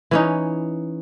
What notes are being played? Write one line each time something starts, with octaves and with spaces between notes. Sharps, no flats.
E3 C#4 D#4